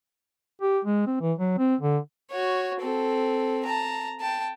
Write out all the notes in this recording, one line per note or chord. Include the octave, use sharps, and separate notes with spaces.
G4
G#3
C4
E3
F#3
C4
D3
F#4 C#5
C4 A4
A5 A#5
G5 A5